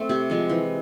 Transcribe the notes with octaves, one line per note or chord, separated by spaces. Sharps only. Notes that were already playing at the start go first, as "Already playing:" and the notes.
Already playing: A3 C4
C3 G4
F3 G#3
E3